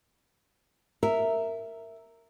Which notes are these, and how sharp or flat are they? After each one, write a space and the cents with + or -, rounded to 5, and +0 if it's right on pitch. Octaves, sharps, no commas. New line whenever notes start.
A#4 -10 E5 +0